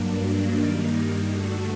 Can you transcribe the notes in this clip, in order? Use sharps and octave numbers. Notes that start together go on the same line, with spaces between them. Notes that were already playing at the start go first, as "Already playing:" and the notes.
Already playing: G2 F#3 A#3 D4
G2 D#3 G3 A#3 D#4
G2 D3 A3 D4 F#4